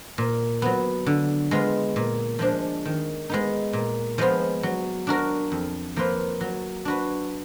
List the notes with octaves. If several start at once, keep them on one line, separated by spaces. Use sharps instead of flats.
A#2
F#3 B3
D3
G#3 B3 F4 B4
A#2
F3 G#3 D4
D#3
G#3 B3 D#4
A#2
F3 G#3 B3 F4
F#3
D4 F#4 A#4
F2
F3 A#3 F4 B4
F#3
D4 F#4 B4